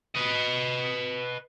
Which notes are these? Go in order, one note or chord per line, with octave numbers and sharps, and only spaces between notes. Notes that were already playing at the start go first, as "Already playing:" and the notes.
B4 D#5